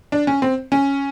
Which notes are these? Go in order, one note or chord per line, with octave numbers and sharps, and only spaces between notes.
D4
C#4
C4
C#4